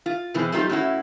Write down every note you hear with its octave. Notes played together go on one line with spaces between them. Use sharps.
F4
B2 E3 G#3 C4 G#4
F#3 A3 C4 D#4 F4 G4
A2 C#4 E4 F#4